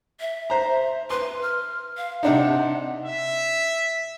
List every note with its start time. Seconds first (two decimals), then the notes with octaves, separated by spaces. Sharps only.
0.20 E5
0.50 C5 A#5
1.10 B4 C6
1.42 F6
1.97 F5
2.23 C3 D4 D#4 F#5
3.06 E5